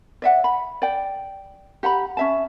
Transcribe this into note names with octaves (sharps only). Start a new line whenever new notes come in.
D5 E5 F#5
B5
D5 G5
G4 F#5 A#5 B5
C#4 E5 A5